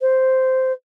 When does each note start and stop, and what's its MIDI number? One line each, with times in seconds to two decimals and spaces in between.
0.01 0.72 72